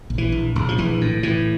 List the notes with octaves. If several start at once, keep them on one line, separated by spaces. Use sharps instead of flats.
A#1
E3
A#1
A#1
F3
A#1 E3
A2
A2 E3